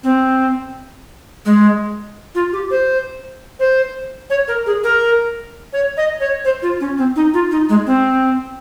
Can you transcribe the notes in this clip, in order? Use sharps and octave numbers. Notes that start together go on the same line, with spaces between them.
C4
G#3
F4
G4
C5
C5
C#5
A#4
G#4
A#4
C#5
D#5
C#5
C5
F4
C#4
C4
D#4
F4
D#4
G#3
C4